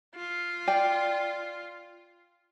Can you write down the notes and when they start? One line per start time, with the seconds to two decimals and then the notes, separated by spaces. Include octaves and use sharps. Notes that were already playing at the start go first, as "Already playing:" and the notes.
0.15 F4
0.67 D5 G5